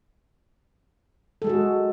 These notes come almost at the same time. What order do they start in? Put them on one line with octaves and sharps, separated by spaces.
A4 G#3 G#4 F#4